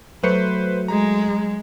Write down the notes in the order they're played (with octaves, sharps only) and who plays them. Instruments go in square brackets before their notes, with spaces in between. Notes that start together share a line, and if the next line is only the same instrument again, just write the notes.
[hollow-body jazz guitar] F#3 [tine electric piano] A3 F#4 C#7 [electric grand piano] B4 C5
[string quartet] G#3 [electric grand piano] A#5